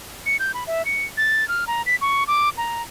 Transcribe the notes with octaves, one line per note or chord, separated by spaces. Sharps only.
C#7
G6
B5
E5
C#7
A6
F6
A#5
B6
C#6
D6
A#5